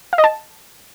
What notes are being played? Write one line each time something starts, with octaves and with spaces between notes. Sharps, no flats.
F5
D#5
A5